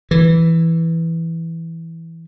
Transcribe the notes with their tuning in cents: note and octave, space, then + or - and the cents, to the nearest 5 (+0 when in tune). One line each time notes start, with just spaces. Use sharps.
E3 +0